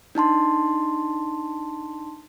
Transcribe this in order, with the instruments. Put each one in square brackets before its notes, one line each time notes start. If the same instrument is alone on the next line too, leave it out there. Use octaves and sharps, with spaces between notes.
[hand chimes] D4 D#4 A5 C6